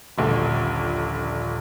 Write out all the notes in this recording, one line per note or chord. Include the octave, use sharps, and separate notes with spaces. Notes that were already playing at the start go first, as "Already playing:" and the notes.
D#1 A#1 D3